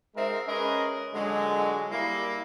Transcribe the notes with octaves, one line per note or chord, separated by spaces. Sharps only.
G#2 G#3 C4 D#4 A#4 E5
G#3 C#4 G#4 A#4 B4 D#5
A#2 D3 F#3 G#3
G3 A#3 E4